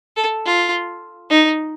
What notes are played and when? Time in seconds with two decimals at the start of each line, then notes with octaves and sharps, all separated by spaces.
0.17 A4
0.46 F4
1.30 D#4